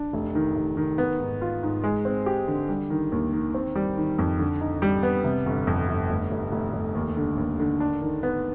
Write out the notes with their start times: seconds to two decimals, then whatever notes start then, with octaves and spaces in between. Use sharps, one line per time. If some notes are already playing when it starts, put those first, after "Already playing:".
Already playing: D4
0.13 F1
0.35 D#3
0.55 F1
0.77 D#3
0.98 B3
1.19 G#2
1.41 F4
1.63 G#2
1.83 G#3
2.05 C4
2.26 G4
2.48 D3
2.69 G3
2.90 D#3
3.12 D#2
3.32 D#3
3.54 C4
3.75 G3
3.97 D#3
4.18 F2
4.39 D3
4.61 D#4
4.82 G3
5.03 B3
5.24 C3
5.46 G1
5.67 F2
5.88 G1
6.10 F1
6.32 F1
6.52 F1
6.73 F1
6.95 D#2
7.17 D3
7.38 D#2
7.59 D3
7.80 D4
8.02 D#3
8.23 B3